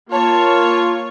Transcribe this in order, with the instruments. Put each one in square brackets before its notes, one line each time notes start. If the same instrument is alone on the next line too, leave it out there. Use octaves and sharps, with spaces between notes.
[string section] A#3 C#5 [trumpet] F4 [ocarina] A5